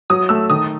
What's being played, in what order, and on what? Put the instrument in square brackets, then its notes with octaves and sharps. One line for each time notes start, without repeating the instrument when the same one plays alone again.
[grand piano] F#3 [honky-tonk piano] D#6
[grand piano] A3 [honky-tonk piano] E6
[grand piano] D#3 [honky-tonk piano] D#6